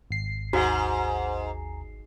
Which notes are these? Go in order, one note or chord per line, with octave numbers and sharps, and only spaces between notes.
G#1 C7
D#2 G#2 F#4 F#5 G#5 A#5